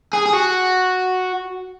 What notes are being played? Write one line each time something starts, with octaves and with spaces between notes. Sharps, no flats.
G#4
G#4
F#4